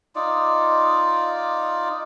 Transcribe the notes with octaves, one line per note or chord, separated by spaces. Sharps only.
D#4 F4 D5